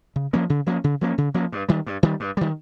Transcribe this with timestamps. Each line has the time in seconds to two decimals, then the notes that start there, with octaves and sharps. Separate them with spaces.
0.16 C#3
0.33 F3 A#3 C#4
0.50 C#3
0.66 F3 A#3 C#4
0.84 C#3
1.01 F3 A#3 C#4
1.18 C#3
1.34 F3 A#3 C#4
1.52 G2
1.69 D#3 G3
1.86 G2
2.03 D#3 G3
2.20 G2
2.37 D#3 G3